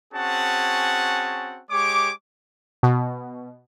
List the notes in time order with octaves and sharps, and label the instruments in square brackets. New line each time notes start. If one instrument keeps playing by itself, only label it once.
[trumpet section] C4 C#4 F#4 G#4 F#5 A5
G#3 G4 C#5 D6
[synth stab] B2